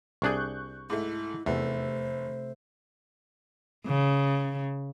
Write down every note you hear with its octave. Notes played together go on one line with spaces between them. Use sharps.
C2 D4 G#4 C#6 F#6 G6
G#2 A3 E4
F1 E2 C3 A3 C5 E5
C#3